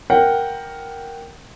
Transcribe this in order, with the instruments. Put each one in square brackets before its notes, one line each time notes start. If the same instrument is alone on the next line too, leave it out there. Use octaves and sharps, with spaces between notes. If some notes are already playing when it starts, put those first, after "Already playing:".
[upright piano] A#4 F#5 G5